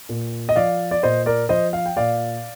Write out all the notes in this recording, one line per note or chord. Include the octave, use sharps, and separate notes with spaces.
A#2
D#5
F3 D5 F5
D5
A#2 C5 D#5
A#4 D5
F3 C5 D#5
F5
G5
A#2 D5 F5